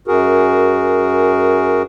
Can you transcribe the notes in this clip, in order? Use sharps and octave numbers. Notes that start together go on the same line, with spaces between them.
F#2 F#4 G#4 A#4